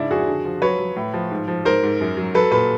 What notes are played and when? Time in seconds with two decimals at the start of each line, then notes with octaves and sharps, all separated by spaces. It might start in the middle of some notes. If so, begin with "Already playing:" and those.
Already playing: G#2 C#3 D4 E4
0.11 F2 F#4 G#4
0.28 D3
0.45 F3
0.62 F#3 B4 C#5
0.79 F#3
0.96 A2
1.14 F3
1.31 G#2
1.48 F3
1.65 G#2 A#4 C5
1.83 G#2
2.01 F#2
2.17 F#3
2.35 F#3 A4 B4
2.51 A#2 A4 B4